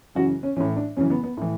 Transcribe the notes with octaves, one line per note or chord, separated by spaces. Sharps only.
F#2 C#3 E3 F#4
C#4
A2 E3 C#4
D4
F#2 C#3 E3 C#4
B3
B3
A2 E3